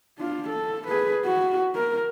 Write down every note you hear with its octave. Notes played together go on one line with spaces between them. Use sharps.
D4 F4
A4
G#4 B4
F#4
A#4